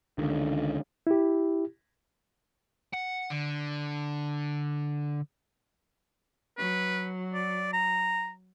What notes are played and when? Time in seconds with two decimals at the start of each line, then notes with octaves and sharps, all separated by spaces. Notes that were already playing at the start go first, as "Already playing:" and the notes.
0.18 C#2 D3 D#3
1.07 E4 G4
2.94 F#5
3.31 D3
6.58 F#3 B4
7.34 D5
7.74 A#5